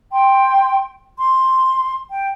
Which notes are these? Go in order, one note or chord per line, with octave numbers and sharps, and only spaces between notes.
G5 C6
C6
G5